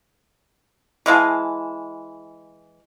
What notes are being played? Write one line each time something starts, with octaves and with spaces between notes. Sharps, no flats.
E3 G#3 F5 A5